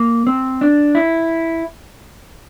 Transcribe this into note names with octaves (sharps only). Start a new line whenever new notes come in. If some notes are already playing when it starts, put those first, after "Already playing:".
Already playing: A#3
C4
D4
E4